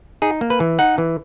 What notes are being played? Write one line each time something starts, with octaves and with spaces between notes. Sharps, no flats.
D#4 G#4
A#3
B4
E3
D#4 F#5
E3